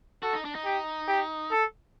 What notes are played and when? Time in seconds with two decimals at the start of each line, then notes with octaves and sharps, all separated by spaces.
0.23 F#4 A4
0.33 D#4
0.45 D4
0.55 D#4
0.65 G4
1.08 G4
1.51 A4